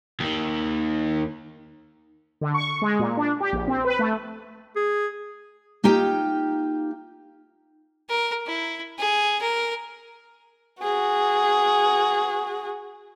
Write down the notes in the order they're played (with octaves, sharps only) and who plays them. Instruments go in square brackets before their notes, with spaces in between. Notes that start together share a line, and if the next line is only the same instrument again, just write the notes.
[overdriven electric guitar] D#2 D#3
[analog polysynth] D3
C#6
G#3
A#2
D4
G4
A#1
C4
B4
A3
[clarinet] G#4
[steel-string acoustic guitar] A#3 D#4 F4 G4 G5
[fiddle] A#4
E4
G#4
A#4
[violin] F#4 G#4